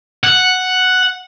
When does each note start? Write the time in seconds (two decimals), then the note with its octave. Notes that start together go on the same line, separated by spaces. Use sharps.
0.24 F#5